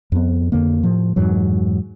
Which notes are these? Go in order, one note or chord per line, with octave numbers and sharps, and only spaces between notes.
F2 B3
F2 D3 A#3
A2 F3
F2 G#2 E3 F#3